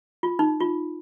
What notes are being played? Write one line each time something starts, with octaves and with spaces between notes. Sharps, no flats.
F4
D#4
F4